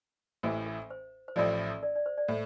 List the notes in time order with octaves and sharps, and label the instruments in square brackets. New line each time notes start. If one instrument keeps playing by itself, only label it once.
[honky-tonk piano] A1 A2 E3 [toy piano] C5
[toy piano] A#4
C5
C5
[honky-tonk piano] A1 A2 F3 [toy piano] A#4 D5
[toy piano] A#4 D5
D5
C5
D5
[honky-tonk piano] A2 [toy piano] C5